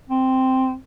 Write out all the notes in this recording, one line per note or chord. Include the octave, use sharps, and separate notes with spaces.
C4